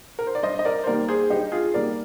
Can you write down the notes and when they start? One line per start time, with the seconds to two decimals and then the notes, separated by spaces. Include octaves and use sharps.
0.19 A#4
0.27 C5
0.35 D5
0.43 G2 C5 D#5
0.59 D#5
0.65 A#4 D5
0.83 C5
0.87 D#3 G3 A#3 A#4 D5
1.09 G#4 C5
1.30 G2 D#4 G4
1.52 F4 G#4
1.74 D#3 G3 A#3 A#4 D5